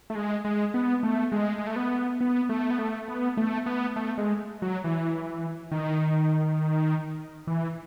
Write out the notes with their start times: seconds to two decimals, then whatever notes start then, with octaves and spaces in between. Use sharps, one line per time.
0.10 A3
0.15 G#3
0.45 G#3
0.74 B3
1.03 A3
1.32 G#3
1.58 G#3
1.67 A3
1.76 B3
2.21 B3
2.49 A3
2.71 B3
2.79 A3
3.08 B3
3.37 A3
3.66 B3
3.96 A3
4.18 G#3
4.62 F#3
4.84 E3
5.72 D#3
7.47 E3